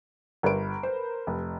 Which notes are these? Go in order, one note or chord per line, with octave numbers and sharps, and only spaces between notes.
G1 A#4 B4 D7
C5
F1